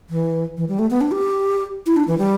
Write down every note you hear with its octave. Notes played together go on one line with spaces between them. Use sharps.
E3
E3
G3
A3
B3
D4
G4
E4
D4
E3
G3